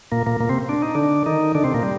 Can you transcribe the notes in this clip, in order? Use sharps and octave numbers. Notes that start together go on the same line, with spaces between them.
A#2 A#3
A#2 A#3
A#2 A#3
C3 C4
D4
D#4
D3 D4
D#3 D#4
D3 D4
C3 C4
A#2 A#3
G3